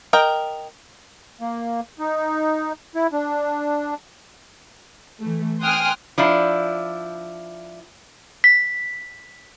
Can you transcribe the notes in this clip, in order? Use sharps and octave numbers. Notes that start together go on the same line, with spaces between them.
A#4 D#5 G5
A#3
D#4
E4
D4
E3 A3
G5 G#5 C6 D#6 F6 F#6
F3 D4 E4
B6